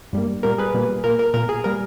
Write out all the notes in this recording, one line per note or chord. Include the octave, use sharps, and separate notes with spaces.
G2 G3 A#3
A#2 G3 A#3 A#4
G#4 B4
A#2 G3 A#3
A#2 A#3 A#4
A#4
A#2 A#3 A#4
G#4
G3 A#3 A#4